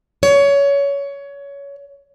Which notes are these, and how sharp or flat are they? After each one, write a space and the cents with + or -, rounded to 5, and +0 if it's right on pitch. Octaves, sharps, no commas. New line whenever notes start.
C#5 +20